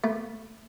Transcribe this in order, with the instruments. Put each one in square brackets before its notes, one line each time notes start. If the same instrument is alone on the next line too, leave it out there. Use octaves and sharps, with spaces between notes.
[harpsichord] A3